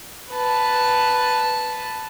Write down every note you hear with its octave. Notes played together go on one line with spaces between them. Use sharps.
B4 A5